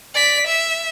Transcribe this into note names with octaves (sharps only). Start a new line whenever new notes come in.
D5 B6
E5